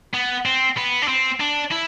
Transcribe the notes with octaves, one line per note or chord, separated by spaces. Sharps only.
B3
C4
B3
D4
C4
D4
E4